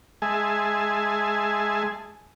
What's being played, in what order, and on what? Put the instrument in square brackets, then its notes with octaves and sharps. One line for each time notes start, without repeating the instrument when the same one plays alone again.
[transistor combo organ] G#3 G#4 E5 G#5 A5